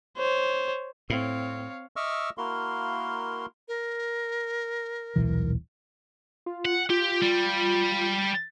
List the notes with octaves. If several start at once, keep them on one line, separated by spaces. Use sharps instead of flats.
C5 C#5
A2 C4 C#5 F5
D#5 E5 C#6 D6 E6 F6
A#3 E4 F#4 A#4 F5 C6
A#4
D#1 B1 E3
F4
F#5
F4 G4
G3